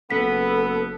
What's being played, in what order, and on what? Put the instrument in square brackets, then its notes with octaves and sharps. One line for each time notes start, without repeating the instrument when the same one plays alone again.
[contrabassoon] F#1 [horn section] B3 [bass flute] A4 [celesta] B6